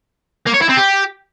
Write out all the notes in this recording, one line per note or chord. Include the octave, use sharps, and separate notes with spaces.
A#3
C#5
E4
C4
G4